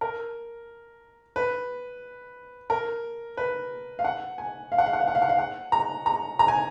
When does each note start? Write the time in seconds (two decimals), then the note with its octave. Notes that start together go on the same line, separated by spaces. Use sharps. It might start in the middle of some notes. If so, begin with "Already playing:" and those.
0.01 A#4
1.36 B4
2.70 A#4
3.37 B4
3.99 F5
4.05 F#5
4.38 G#5
4.72 F5
4.78 F#5
4.86 F5
4.93 F#5
5.00 F5
5.08 F#5
5.15 F5
5.22 F#5
5.29 F5
5.38 F#5
5.72 A#5
6.06 A#5
6.39 A#5
6.48 G#5